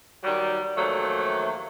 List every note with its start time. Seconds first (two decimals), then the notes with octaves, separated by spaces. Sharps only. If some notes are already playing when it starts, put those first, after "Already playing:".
0.24 D#3 F#3 G3
0.77 D#2 F3 F#3 A3